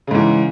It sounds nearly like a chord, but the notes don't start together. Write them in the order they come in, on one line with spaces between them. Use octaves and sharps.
C#3 G#2 E3